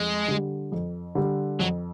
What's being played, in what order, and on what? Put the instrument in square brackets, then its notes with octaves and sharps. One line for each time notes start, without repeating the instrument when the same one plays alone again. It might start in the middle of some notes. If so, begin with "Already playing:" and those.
Already playing: [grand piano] F2 [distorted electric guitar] G#3
[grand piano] D3 G3
F2
D3 G3
[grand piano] F2 [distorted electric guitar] F#3